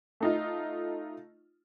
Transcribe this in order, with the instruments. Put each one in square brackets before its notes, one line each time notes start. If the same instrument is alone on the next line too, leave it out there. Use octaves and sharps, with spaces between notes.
[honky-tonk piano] A3 D#4 F4